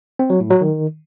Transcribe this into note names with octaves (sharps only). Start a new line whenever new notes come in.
C4
F#3
A2
F#3
D#3